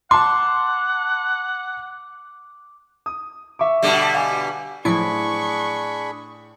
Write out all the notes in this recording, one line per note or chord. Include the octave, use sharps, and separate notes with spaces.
F#5 A5 C6 D6
D#6
E5 C#6 D6
B2 D3 G3
F5 G#5
A2 F3 F#3 D4 E4 G#4 B5 C#6